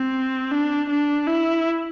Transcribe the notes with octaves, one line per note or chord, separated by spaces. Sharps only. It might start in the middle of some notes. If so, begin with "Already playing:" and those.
Already playing: C4
D4
D4
E4